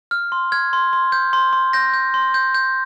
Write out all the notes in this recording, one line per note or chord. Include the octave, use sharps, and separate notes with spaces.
F6
C6
F6 G#6
C6
C6
G6
C6
C6
G6 A#6
G6
C6
G6
G6